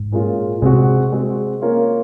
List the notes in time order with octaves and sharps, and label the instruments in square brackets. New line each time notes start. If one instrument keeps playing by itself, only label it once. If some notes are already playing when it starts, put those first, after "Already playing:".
Already playing: [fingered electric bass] G#2
[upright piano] A#2 G#3 C#4 F4
[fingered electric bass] C3 [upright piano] G#3 C4 F#4
[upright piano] G#3 C4 F#4
A#3 C#4 F4 A#4 C#5